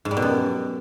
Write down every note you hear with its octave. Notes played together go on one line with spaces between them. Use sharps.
G#2
G3
B2
F#2